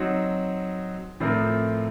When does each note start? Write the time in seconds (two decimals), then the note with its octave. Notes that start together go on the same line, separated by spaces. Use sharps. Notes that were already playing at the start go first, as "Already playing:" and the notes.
Already playing: F#3 C4 D#4
1.20 A2 F3 C4 F4 A#4